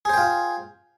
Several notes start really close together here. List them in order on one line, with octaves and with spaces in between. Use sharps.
G#4 C5 G5 F4